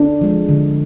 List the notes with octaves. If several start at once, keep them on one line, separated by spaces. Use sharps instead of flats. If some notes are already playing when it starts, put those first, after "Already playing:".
Already playing: D4
F3 G#3
D3